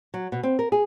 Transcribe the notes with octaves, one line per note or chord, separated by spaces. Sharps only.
F#3
B2
C4
A#4
G#4